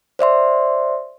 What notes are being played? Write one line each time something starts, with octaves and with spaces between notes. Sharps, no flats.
C5 D5 E5 C6